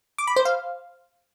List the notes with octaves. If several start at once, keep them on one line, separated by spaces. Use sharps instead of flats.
D6
B5
C5
F5